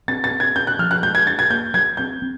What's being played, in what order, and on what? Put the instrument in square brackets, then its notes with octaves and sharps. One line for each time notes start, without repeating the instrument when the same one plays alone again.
[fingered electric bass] C4 [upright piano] A6
[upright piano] A6
[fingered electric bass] C4
[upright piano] G#6
[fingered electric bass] C#4 [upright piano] G6
[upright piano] F#6
[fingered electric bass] F3 [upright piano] F6
[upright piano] F#6
[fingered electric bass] G#3 [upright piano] G6
[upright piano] G#6
[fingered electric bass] D4 [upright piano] A6
[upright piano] G#6
[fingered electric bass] A#3 [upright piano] G6
[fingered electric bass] F#3 [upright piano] G#6
[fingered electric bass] C4 [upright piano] G6
[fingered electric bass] C4